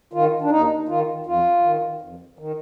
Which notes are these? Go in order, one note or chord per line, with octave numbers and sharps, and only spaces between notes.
D#3 F4
D4
D#2 D#4
D#3 F4
F2 F4
D#3
F2
D#3